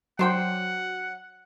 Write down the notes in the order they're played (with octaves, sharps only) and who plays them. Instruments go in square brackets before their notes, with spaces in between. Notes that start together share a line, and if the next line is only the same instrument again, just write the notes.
[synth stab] F#3 [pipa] D4 C5 G5 [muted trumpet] F#5